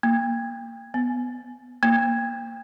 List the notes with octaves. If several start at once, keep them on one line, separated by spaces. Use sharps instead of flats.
A#3
B3
A#3